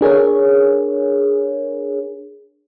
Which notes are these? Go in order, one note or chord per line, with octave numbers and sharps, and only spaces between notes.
D4 G#4 A#4 C#5